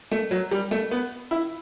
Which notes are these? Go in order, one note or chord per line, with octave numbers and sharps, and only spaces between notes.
A3
F#3
G3
A3
B3
E4